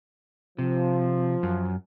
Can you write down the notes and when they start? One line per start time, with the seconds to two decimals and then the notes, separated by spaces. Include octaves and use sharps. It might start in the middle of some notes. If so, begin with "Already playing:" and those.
0.59 C3 F3
1.43 F#2